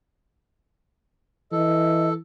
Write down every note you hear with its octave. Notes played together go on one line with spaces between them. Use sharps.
E3 A4 D#5